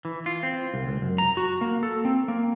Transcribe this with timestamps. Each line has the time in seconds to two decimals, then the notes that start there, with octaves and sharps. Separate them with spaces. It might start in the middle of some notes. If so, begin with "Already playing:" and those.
0.05 E3
0.26 F4
0.43 C4
0.74 C2
0.87 C#2
1.02 F#2
1.18 A#5
1.37 F#4
1.61 A#3
1.83 A4
2.05 C4
2.28 A#3